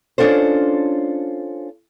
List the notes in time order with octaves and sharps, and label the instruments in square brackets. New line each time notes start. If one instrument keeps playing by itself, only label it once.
[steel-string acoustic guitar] C#4 D4 F4 A4 C5